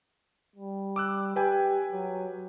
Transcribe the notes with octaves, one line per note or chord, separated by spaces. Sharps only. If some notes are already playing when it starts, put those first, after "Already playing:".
G3
D6 E6 F#6
G4 B4 G5 G#5
F#3